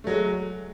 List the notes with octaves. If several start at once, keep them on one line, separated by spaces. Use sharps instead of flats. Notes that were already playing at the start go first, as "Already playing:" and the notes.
F#3 G#3 A3